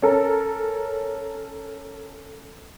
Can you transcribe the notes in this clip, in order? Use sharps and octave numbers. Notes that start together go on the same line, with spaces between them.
C#4 A4 A#4